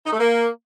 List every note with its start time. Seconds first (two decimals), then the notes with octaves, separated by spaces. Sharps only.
0.06 D#4
0.13 A3
0.20 A#3